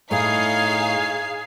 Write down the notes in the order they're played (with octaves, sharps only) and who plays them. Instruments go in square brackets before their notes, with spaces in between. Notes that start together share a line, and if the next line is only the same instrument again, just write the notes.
[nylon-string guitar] A2 [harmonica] D#4 C#5 [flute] G#4 [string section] F5 C7